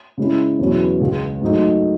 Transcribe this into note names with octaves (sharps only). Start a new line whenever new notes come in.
C#3 G#3 C#4 E4
E2 B2 F#3 C#4 E4
C#2 C#3 G#3
G#2 F#3 A3 D#4